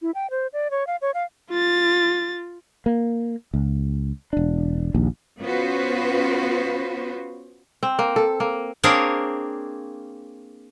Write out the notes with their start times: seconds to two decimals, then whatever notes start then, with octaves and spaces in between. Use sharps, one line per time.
0.02 E4
0.15 G5
0.31 C5
0.53 D5
0.71 C#5
0.87 F5
1.02 C#5
1.14 F5
1.50 F4 A6
2.86 A#3
3.54 C#2
4.33 E1 D4
4.95 A#1 D#2
5.41 B3 C#4 F4 F#4 B4 C5
7.83 C4
7.99 A#3
8.16 A4
8.40 A#3
8.83 A#3 C4 D4 G#4 A#4 C#5